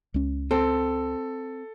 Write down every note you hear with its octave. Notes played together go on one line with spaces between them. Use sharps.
C#2 C#4
C4 A4